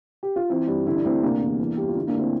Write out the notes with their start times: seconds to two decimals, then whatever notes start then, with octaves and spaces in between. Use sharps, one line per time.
0.23 G4
0.36 F4
0.50 E3 C4 E4
0.68 G2
0.86 D3 E4
0.96 D4
1.04 D2 C4 E4
1.23 C3 A#3 D4
1.41 E2
1.59 E3
1.77 G2 G4
1.88 F4
1.96 D3 E4
2.07 A#3 D4
2.14 D2
2.20 C4 E4